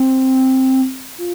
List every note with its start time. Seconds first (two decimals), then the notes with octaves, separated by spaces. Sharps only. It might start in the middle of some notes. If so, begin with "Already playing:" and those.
Already playing: C4
1.19 F4